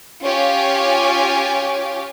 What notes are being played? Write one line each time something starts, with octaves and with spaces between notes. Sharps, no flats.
C#4 F4 G4 C#5 F5 G#5